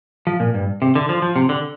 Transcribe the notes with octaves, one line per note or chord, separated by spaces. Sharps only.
F3
A#2
G2
C3
D3
F3
F3
C3
D3